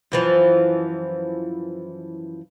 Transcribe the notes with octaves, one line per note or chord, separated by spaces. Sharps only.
F#2 E3 F3